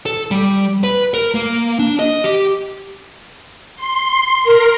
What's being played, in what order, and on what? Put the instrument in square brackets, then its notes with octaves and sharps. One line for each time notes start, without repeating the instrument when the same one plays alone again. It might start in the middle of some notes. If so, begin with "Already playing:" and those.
[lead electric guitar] A4
G3
B4
A#4
A#3
D4
D#5
G4
[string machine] C6
A#4